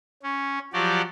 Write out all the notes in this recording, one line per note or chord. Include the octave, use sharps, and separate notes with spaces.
C#4
F3 F#3 F#4 G4 D5